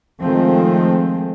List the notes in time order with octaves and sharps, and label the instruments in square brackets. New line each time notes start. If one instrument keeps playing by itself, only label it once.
[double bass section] D#3 F3 G#3 A3 C4